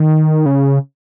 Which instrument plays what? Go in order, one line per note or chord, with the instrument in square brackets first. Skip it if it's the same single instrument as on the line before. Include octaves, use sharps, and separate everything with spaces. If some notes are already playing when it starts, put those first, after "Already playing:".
Already playing: [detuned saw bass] D#3
C#3